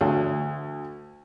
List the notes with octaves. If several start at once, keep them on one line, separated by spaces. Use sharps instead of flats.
D2